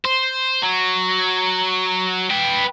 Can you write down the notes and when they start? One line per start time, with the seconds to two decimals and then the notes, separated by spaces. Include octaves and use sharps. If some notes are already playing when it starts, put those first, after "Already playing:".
0.05 C5
0.62 F#3
2.31 B4 G5